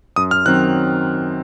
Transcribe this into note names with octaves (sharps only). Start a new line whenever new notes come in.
F#2 D#6
F6
D#3 F#3 C4 F#6